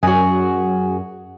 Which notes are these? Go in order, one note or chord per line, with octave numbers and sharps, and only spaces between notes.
F#2 F#4 G#4